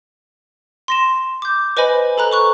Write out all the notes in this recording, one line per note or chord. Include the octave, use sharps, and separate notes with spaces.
C6 A#6 E7
D6 G6
B4 C5 D#5 G#5 B5
A4 C5 A#5 B5 F#6
C5 C#6 F#6